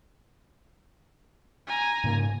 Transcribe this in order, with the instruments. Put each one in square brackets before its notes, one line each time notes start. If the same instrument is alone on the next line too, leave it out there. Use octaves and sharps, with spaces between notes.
[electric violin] G#5 A#5
[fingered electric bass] G#2 C#3 A#3